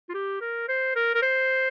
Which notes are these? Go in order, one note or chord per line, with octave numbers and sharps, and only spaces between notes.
F4
G4
A#4
C5
A#4
A#4
C5